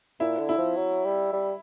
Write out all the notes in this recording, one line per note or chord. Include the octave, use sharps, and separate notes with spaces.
A#2 E4
D3
E4
F3
F#3
G3
G3